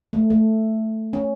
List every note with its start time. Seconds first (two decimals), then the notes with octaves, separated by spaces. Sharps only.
0.13 A3
0.30 A3
1.13 C#4